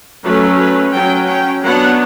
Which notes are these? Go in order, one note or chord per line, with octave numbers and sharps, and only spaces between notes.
F#3 A3 C#4 B4
B4
F#3 C#4 G5
G5
F#3 B3 D4 F#5